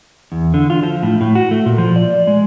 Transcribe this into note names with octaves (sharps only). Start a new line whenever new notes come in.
E2
D3
F4
F3
A2
A2
F#4
A3
A#2
F3
D5
G#3